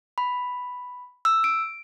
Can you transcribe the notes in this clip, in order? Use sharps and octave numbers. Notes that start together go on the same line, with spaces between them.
B5
E6
D7